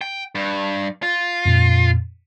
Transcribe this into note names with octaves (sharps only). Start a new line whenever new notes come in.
G5
G2
F4
F2 A#2